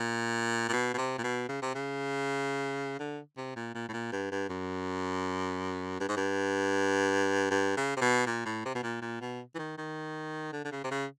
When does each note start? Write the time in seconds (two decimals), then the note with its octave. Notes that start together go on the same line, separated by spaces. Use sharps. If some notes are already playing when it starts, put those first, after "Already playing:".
Already playing: A#2
0.69 A#2
0.73 B2
0.94 B2
0.98 C3
1.18 A#2
1.24 B2
1.49 C#3
1.62 C3
1.75 C#3
2.99 D3
3.37 C3
3.56 A#2
3.75 A#2
3.89 A2
3.93 A#2
4.12 G2
4.32 G2
4.49 F#2
6.00 G2
6.09 G#2
6.17 G2
7.51 G2
7.77 C#3
7.97 C3
8.01 B2
8.26 A#2
8.45 A2
8.65 C3
8.75 B2
8.83 A#2
9.02 A#2
9.21 B2
9.55 E3
9.59 D#3
9.78 D#3
10.53 D3
10.65 D3
10.72 C#3
10.84 C3
10.91 C#3